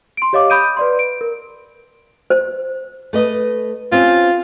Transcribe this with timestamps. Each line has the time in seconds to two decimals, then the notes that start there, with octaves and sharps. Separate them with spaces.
0.17 C6 D7
0.33 G4 C#5 D#5 F5 D6
0.50 B5 D#6 G6 D7 D#7
0.77 B4 D5 C6
0.99 D7
1.21 A#4
2.30 C5
3.13 A3 B4 D#5
3.92 C4 C#4 F4 G4